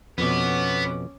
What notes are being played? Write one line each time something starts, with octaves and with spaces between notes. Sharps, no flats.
F2 B2 B3 C#4 D6